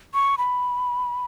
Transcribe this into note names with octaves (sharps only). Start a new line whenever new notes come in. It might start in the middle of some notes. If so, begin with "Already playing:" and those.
C#6
B5